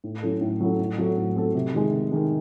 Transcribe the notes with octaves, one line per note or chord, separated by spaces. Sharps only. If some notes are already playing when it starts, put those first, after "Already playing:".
A2
F#3 C#4 E4 A4
A2
F#3 C#4 E4 A4
A2
F#3 C4 F#4 A4
A2
F#3 C4 F#4 A4
C3
D#3 G#3
C3
D#3 G#3